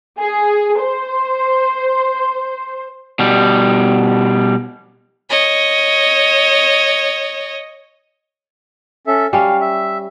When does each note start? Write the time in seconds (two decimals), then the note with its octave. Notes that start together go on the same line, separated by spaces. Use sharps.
0.19 G#4
0.80 C5
3.19 B2 G3
5.30 C#5 D#5
9.07 C#4 A4 E5
9.33 G3 C#4 F5
9.61 E5